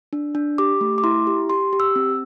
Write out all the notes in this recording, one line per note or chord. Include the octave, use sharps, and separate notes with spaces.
D4
D4
G4 D6
A3
D6
E4 C6
G4
G4 C6
G4
E6
C4